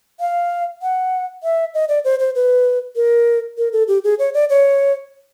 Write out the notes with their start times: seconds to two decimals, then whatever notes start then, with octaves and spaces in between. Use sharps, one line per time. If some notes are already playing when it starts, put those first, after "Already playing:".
0.20 F5
0.82 F#5
1.43 E5
1.74 D#5
1.89 D5
2.05 C5
2.20 C5
2.35 B4
2.96 A#4
3.58 A#4
3.73 A4
3.88 G4
4.04 G#4
4.19 C#5
4.34 D5
4.50 C#5